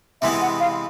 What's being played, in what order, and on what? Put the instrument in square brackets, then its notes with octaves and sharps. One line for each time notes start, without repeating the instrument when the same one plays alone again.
[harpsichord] C3 E3 G#3 B3 [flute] E5
[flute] F#5
F5